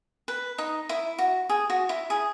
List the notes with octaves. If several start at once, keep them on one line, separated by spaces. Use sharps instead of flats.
B4
D#4
E4
F#4
G#4
F#4
E4
G#4